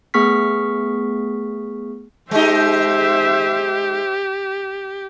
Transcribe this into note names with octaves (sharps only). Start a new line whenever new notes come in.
A3 B3 G#4 C#6 F6 B6
G#3 D#4 G4 C5 E5